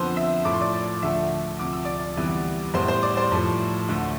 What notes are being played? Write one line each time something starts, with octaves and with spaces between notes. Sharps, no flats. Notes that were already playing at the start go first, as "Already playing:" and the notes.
Already playing: F2 D3 F3 B3 C5 C6
E5 E6
A2 F3 A3 D6
C6
D5 D6
D2 D3 F3 A3 E5 E6
D2 C3 F3 D6
E6
D5 D6
D2 C3 E3 G3 B3
A2 G3 B3 C5 C6
C5 C6
D5 D6
C5 C6
A2 F3 A3
D2 D3 A3